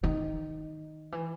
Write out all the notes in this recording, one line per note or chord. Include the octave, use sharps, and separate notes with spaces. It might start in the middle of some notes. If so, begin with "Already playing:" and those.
D#3
E3